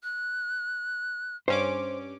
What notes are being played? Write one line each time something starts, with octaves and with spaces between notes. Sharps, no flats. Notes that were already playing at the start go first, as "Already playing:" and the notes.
F#6
G2 C#4 C5 D6